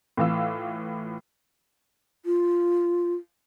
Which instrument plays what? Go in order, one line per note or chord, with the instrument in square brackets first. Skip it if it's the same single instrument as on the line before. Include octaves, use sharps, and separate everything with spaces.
[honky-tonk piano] A2 E3 F4 E6
[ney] F4